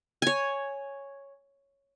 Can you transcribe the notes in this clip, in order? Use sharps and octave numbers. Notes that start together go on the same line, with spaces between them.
C#5 G#5